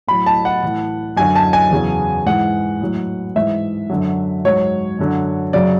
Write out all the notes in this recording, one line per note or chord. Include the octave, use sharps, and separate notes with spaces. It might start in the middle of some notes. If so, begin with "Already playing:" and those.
A2 F#3 B5
A5
F#5
A2 E3
F#2 D3 F#3 G#5
A5
G#5
E2 C#3 F#3
G#2 E3 F#5
A2 F#3
G#2 E3 E5
F#2 D3 F#3
G#2 F#3 C#5
F#2 D3 F#3
F#2 C#3 F#3 D5